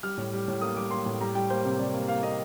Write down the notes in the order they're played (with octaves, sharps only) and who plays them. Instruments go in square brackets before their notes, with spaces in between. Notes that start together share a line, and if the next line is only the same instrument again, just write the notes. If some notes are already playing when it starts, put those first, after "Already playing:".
[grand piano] G3 F6
A2
G3
A2
A#3 D#6
G3 D6
A#3 C6
A2
G3 A#5
G3 G5
A#3 C5
C3
C3 D5
A#3
A#3 F5
A#3 D#5